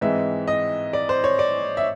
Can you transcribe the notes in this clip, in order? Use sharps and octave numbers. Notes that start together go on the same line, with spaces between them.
G#2 E3 G#3 C4 E5
D#5
D5
C5
C#5
D5
E5